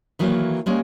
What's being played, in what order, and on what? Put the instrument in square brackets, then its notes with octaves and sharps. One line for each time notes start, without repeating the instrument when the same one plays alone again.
[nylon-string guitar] D#3 E3 F#3 A3 A#3
G3 G#3 A#3 C#4